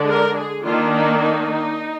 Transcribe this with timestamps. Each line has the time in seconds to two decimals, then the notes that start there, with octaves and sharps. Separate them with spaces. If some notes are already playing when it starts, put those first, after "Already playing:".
Already playing: D3 G#3 D4
0.09 A#4
0.37 G#4
0.65 D#3 A#3 D4 F4
0.94 D#4
1.22 D#4